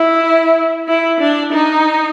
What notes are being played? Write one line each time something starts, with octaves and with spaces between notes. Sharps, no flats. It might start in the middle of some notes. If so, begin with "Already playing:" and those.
Already playing: E4
E4
D4
D#4